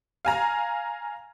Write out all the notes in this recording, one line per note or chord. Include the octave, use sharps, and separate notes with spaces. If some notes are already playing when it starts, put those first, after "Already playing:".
F5 G#5 A#5